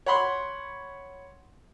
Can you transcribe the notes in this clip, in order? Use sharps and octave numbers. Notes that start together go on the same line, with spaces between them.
C#5 F#5 B5 C6